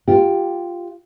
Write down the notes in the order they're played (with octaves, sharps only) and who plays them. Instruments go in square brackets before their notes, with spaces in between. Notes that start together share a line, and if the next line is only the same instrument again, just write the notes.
[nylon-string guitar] F4 G4